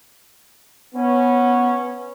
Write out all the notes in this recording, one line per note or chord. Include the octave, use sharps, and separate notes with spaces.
B3 C#4